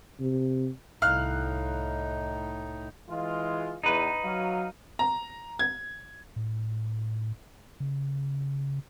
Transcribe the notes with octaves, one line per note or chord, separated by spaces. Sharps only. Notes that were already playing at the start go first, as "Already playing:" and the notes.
C3
C2 A2 D#4 F5 F6 F#6
E3 G#3 F4
E2 D#4 B4
F#3 F5
A#5
G#6
A2
C#3